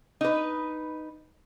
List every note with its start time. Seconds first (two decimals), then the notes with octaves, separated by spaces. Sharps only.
0.21 D#4 B4